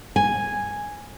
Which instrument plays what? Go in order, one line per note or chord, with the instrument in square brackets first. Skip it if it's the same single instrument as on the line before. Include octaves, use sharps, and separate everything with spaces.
[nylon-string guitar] G#5